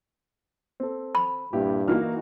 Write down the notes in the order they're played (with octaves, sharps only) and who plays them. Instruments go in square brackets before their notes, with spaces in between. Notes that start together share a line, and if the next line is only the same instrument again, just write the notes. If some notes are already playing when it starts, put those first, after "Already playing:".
[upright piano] C4 A4
[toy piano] B5
[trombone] G2 [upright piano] A#2 E4 G4
[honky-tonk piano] E3 D#4 F#4 [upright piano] A#3 F6